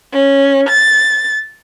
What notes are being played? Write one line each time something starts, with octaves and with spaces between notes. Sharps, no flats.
C#4
A6